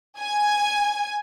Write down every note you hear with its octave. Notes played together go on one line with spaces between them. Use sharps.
G#5